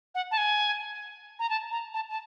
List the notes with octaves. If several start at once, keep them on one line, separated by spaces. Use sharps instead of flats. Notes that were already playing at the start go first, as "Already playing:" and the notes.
F#5
A5
G#5
A#5
A5
A#5
A5
A5